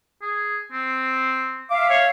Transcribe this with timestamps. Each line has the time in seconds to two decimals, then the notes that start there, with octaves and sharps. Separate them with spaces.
0.22 G#4
0.72 C4
1.70 E5 F5 D6
1.90 C#5